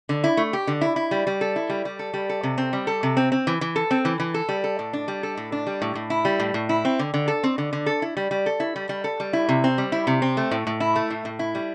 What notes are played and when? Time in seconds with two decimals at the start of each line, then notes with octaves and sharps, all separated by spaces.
0.09 D3
0.24 E4
0.37 A3
0.53 G4
0.67 D3
0.81 E4
0.96 E4
1.11 G3
1.27 G3
1.41 A4
1.56 E4
1.70 G3
1.85 G3
1.99 A4
2.14 G3
2.29 A4
2.43 C3
2.58 C4
2.73 G3
2.87 A4
3.03 C3
3.17 C4
3.32 C4
3.47 E3
3.61 E3
3.76 A4
3.91 C4
4.05 E3
4.20 E3
4.34 A4
4.49 G3
4.64 A4
4.79 A2
4.93 D4
5.08 G3
5.23 A4
5.37 A2
5.52 D4
5.67 G3
5.82 A2
5.95 A2
6.10 E4
6.25 G3
6.40 A2
6.54 A2
6.69 E4
6.85 C4
6.99 D3
7.14 D3
7.28 A4
7.44 C4
7.58 D3
7.73 D3
7.86 A4
8.02 E4
8.17 G3
8.31 G3
8.46 A4
8.60 E4
8.76 G3
8.89 G3
9.04 A4
9.20 G3
9.33 E4
9.49 C3
9.64 C4
9.78 G3
9.92 E4
10.07 C3
10.22 C4
10.37 A3
10.51 A2
10.67 A2
10.80 E4
10.96 A3
11.10 A2
11.25 A2
11.39 E4
11.55 G3